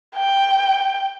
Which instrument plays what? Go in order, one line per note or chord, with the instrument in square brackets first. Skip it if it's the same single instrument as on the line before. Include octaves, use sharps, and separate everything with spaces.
[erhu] G5